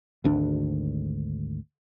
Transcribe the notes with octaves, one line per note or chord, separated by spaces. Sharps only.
G#1 D2 D4